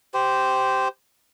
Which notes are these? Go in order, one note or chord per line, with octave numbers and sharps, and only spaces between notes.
G4 C5